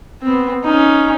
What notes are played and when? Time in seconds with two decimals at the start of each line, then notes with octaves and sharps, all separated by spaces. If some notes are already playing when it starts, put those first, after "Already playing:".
0.22 B3 C4
0.64 C#4 D#4